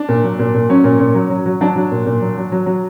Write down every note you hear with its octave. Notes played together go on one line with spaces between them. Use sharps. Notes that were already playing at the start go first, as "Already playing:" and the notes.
Already playing: D4
A#2
F#3
A#2
A#2
F#3 C#4
A#2
A#2
F#3
F#3
F#3
F#3 D4
F#3
A#2
A#2
F#3
F#3
F#3
F#3